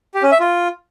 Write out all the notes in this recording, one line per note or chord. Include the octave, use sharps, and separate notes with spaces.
G4
C#4
E5
F4